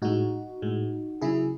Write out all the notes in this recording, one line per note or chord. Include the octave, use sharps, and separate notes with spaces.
A2 G#3 D#4 F#4
A2 G#3
C#3 F#3 E4 G#4